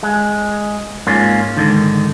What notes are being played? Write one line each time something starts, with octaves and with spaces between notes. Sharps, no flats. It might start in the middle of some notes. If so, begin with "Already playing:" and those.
G#3
G#2 A#3 C#4 F4
G#2 D3 D#3